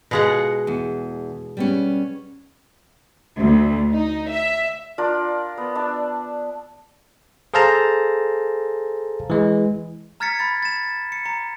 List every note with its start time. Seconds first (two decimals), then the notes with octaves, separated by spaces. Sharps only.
0.11 B2 G#3 F4 A4 F5 F#5
0.67 E2
1.57 G3 B3 C#4
3.37 D2
3.92 D#4
4.31 E5
4.98 D4 F4 A#4 D5
5.58 B3
5.75 D4 E5 A5
7.54 G#4 A4 C5 F5 A5 A#5
9.30 E3 G#3
10.20 A#5 F6 G#6 A6 B6 C#7
10.39 B5 G#6 A6
10.63 A6 E7
11.12 C#7
11.26 A#5 C#7